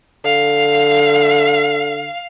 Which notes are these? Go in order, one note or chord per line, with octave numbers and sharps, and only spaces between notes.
D3 F5